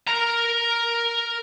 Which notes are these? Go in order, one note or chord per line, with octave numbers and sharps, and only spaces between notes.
A#4 A#5